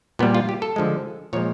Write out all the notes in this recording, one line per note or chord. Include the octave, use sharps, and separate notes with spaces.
A#2 G3 B3
F4
G4
A4
D3 F3 G#3
A#2 F3 G#3 C#5